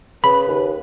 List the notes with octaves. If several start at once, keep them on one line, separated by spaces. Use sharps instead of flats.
C#3 B4 B5
D#2